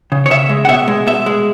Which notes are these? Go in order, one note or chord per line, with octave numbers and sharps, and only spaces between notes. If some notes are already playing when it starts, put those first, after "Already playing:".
C#3
C#5
C#3 E5
G#3
F#5
B2 E5
G#3
B2 E5
G#3